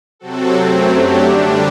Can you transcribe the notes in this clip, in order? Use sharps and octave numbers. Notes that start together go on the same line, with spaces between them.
C3 F#3 C4 F#4 A4
F#2 F#3 A3 C4
F#3 A3 D4 G4
D3 G3 D4